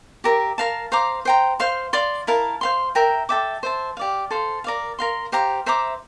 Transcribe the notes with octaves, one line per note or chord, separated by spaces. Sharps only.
G4 A#4 E5
A#4 F5 A5
C5 F5 A#5 D6
C5 G5 A#5
C5 F5 C6
D5 F5 C6
E4 A#4 F5 A5
C5 F5 C6
A#4 E5 G5 A#5
A4 E5 G5 D6
C5 E5 A5
G4 D5 F5
A4 C5 F5
A#4 D5 F5
A#4 F5 C6
G4 C5 F5 A#5
C5 E5 A#5 D6